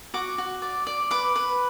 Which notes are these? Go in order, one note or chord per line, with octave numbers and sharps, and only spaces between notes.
F#4 D6
F#4
D5
D5
B4 D6
B4